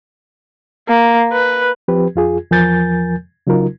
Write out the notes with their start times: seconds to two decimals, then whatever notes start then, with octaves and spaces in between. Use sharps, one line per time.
0.88 A#3
1.33 B4
1.88 F3 C4 G4 B4
2.15 F2 F4 G#4
2.51 E2 F3 A#4 G#5 G6 A6
3.47 C#3 F#3 D#4 F4 A#4